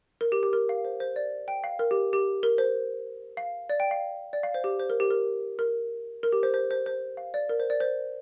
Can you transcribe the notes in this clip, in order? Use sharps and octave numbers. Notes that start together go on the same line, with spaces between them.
A#4
G4
G4
A#4
F5
C5
C5
D5
G5
F5
A#4
G4
G4
A#4
C5
F5
D5
G5
F5
D5
F5
C5
G4
C5
A#4
G4
A#4
A#4
A#4
G4
C5
C5
C5
C5
F5
D5
A#4
C5
D5
C5